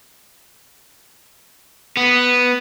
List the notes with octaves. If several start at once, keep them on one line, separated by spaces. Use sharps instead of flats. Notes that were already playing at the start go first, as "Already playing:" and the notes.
B3